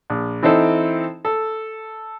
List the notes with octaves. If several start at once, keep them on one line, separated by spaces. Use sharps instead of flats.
A#1
E3 C4 D#4 E4 A4 C5
A4